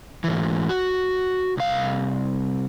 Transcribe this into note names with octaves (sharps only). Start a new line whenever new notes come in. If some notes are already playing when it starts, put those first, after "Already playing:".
G#2 E3
F#4
C2 F5